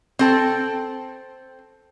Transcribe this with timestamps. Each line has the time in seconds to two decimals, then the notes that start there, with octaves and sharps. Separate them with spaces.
0.19 C4 A4 G5